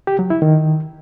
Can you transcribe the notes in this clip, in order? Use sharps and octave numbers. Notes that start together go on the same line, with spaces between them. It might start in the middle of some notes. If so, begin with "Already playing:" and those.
G4
F#3
E4
D#3